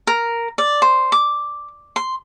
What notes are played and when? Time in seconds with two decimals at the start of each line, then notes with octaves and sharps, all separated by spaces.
0.07 A#4
0.58 D5
0.82 C5
1.12 D6
1.96 C6